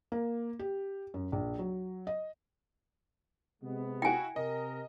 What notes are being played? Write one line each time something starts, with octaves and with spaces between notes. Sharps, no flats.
A#3
G4
F#2
A#1
F#3
D#5
C3 G#3 B3
E4 F#4 G5 G#5
C3 A#4 D#5